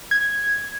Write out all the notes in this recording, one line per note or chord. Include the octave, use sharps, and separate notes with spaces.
G#6